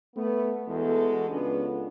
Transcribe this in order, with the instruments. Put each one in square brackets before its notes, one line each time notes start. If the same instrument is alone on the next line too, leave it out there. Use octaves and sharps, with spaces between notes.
[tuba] A3 [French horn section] B3
[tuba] E2 [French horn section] G#3 F#4 A4
[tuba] C#2 [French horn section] B3 C#4 D4